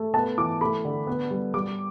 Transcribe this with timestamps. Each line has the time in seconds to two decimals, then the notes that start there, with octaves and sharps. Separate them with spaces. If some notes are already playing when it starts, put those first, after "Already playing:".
Already playing: A3
0.14 B3 A5
0.38 E3 D6
0.61 A3 B5
0.85 D3
1.07 B3
1.30 G3
1.54 G3 D6